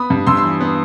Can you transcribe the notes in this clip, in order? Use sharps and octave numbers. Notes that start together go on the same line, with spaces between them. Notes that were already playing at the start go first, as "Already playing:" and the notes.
Already playing: B3 B5 D#6
G2
G2 C6 E6
C6 E6
E3
B3